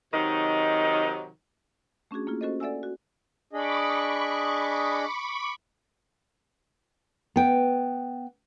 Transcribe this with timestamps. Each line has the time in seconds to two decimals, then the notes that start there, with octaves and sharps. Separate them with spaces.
0.13 C3 D#3 F#3 D#4
2.11 A3 C#4 D4 F#4 G#4
2.27 A#3 E4 F4 G#4
2.41 C#4 F#4 A4 C5 D#5
2.60 A4 D5 E5 F#5 G#5 E6
2.83 F#4
3.53 D4 G#4 D#5 B5 C#6 D6
7.36 B3 G5